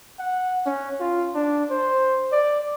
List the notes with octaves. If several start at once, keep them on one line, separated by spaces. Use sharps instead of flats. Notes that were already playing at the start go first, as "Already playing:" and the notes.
F#5
C#4
F4
D4
C5
D5